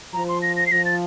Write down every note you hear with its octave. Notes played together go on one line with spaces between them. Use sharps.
F3 A#5
C6
A#6
A#6
C7
F3 A#6
A6